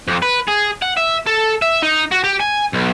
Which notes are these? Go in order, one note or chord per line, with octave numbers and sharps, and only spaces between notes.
F2
B4
G#4
F#5
E5
A4
E5
D#4
F#4
G4
G#5
B1